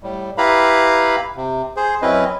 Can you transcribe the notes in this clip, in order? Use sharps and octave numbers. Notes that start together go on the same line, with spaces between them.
A2 G3
E4 G4 B4 F5 A#5 B5
C3
G#4 C5
F#2 C4 C#4 E4 B4 D#5